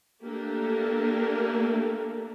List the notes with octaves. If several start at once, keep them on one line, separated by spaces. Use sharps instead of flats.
A3 A#3 D4 G4 A4 A#4